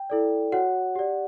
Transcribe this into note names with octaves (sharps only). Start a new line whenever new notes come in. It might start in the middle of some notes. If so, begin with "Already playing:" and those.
Already playing: G5
E4 A4 D5
F#4 C#5 F#5
G4 D5